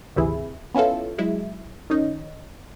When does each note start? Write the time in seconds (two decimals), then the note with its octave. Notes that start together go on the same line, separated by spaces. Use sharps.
0.16 G#1 D2 C3 E3 E4 G#4
0.74 B3 C#4 E4 F4 A4
1.18 F#3 G#3 E4
1.90 D#3 C#4 D#4